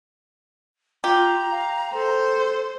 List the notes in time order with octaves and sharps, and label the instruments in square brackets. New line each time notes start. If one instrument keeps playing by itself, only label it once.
[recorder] F4 [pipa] G4 [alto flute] A#5
[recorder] F5
[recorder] A4 [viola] C5